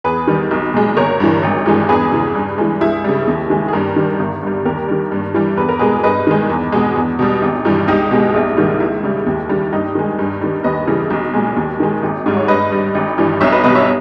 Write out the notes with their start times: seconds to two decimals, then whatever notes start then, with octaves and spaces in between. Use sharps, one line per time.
0.04 E2 G#4 B4
0.27 D#3 G3
0.51 B1
0.74 A#2 G#3
0.97 G1 A#4 C#5
1.20 G2 E3
1.43 G#1
1.66 G2 E3 G#3
1.89 E2 G#4 B4
2.12 C#3 E3
2.35 G2
2.58 E3 G#3
2.81 C#2 E4 G#4
3.04 C#3 G3
3.27 D#2
3.50 D#3 G#3
3.68 G#4
3.73 G2 G4 A#4
3.96 D#3 G3
4.19 G1
4.43 G2 G3
4.65 D#2 G4 A#4
4.88 D#3 G3
5.12 G2
5.34 E3 G3
5.57 E2 B4
5.69 A#4
5.79 B2 G#3 G#4 B4
6.04 G2 B4 D#5
6.27 D#3 G#3
6.49 E2
6.72 B2 G#3
6.96 E2
7.19 B2 G3
7.42 G#1
7.65 G2 E3 G3
7.88 C#2 D#4 G4
8.11 B2 G#3
8.34 A#1
8.57 G#2 D#3 G3
8.80 C#2 E4
9.03 C#3 G3
9.26 D#2
9.49 D#3 G3
9.72 G2 D#4 G4
9.95 D#3 G#3
10.19 G2
10.41 D#3 G3
10.64 D#2 B4 D#5
10.87 C#3 E3 G3
11.10 B1
11.34 A#2 G#3
11.56 D#2
11.80 D#3 G#3
12.03 G#1
12.26 G#2 G3
12.37 C#5
12.48 G2 B4 D#5
12.72 G3
12.95 G#1
13.18 G2 E3 G3
13.40 B1 C#5 E5
13.52 B4 D#5
13.64 B2 B4 D#5
13.67 G3
13.75 C#5 E5